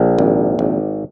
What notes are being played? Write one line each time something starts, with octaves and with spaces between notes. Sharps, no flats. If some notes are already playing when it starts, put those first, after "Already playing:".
Already playing: A#1
G#1
G#1